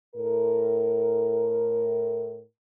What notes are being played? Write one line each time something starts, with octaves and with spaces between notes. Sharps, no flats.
A2 A#4